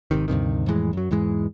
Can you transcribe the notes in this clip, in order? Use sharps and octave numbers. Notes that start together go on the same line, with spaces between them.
G#1 C3 D#3
D2 G2 C3 D#3
F2 A2 E3 G#3
F#2 F#3
E2 G#2 E3 G#3